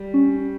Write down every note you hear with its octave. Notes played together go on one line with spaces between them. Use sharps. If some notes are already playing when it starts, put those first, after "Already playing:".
Already playing: G3
C#4